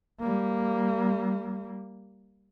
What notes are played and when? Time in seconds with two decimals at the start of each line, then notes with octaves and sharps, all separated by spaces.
0.20 G3 A#3